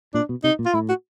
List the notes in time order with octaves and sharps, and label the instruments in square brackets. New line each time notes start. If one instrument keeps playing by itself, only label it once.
[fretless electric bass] A#2 [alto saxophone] D4
[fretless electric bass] B2
[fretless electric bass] C3 [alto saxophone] D#4
[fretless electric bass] A#2
[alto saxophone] F4
[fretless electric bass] A2 [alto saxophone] E4
[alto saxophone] F#4